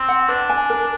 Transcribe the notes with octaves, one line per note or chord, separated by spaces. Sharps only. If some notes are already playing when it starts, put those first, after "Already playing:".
Already playing: C4
F#5
D4 B4
G#5
A#4